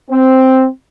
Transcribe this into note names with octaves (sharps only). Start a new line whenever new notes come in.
C4